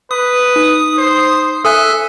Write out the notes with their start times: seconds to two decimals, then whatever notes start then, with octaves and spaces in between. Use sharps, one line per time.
0.11 B4 D#6
0.56 D#4
0.97 C5
1.65 A4 E5 G#5 D#6 F#6